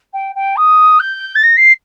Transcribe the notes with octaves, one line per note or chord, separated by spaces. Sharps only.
G5
G5
D#6
G6
A6
A#6
C7